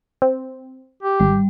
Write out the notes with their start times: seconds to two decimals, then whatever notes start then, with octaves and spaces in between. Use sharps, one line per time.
0.22 C4
1.03 G4
1.20 G#1 G3